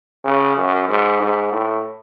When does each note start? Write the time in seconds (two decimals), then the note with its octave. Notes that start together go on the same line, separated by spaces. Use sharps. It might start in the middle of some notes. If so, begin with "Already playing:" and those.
0.25 C#3
0.57 F#2
0.88 G#2
1.20 G#2
1.52 A2